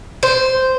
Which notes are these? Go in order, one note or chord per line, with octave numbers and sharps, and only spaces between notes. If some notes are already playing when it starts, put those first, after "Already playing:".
C5